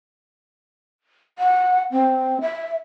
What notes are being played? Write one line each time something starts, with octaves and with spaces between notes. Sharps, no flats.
F#5
C4
E5